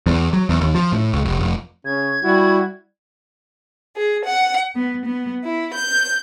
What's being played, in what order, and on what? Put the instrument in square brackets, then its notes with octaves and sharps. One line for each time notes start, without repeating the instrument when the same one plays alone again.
[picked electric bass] E2
F#3
E2
D#2
F3
A2
C#2
F1
F1
[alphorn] C#3 [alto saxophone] C#4 [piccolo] G#6
[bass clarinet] G3 [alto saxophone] E4 [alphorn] F#4
[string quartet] G#4
F#5
B3
B3
E4
G6